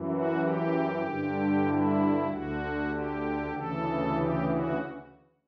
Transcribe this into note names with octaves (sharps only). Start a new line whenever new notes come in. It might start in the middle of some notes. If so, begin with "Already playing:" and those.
Already playing: F#2 E3
F#4
G4
G2 D3
E4
D2 D3 F#4
G4
D2 C#3 E3 A4
G4
F#4